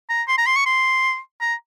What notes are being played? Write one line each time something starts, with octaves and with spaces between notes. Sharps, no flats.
A#5
C6
A#5
C6
C#6
C6
A#5